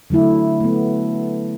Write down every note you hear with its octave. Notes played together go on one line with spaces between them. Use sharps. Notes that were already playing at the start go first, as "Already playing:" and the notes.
D3 F#3 A3 E4
A3 B3